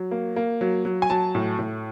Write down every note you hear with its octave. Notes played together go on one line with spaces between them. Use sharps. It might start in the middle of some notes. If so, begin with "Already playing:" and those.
Already playing: F#3
A#3
A#3
F#3
F#3
G#5
F#3 A5
A2
A2